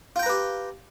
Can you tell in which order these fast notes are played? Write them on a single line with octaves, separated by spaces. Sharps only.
F4 G5 A#5 B4 G4